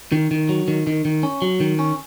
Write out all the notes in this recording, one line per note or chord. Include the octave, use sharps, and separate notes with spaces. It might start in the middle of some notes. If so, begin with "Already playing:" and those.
D#3
D#3
F#3
D#3
D#3
D#3
C#4
F#3
D#3
C#4